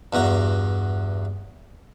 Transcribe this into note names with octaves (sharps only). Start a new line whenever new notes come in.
E2 G2 F#4 A#5